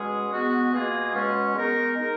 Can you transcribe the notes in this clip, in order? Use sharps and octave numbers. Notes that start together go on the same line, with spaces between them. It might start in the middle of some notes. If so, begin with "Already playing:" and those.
Already playing: B2 G#3 C#4 G#4
G#3 B3 F#4
B2 A#3 F4 G#4
B2 G#3 C#4
G#3 B3 D#4 A#4
G#3 D#4 A#4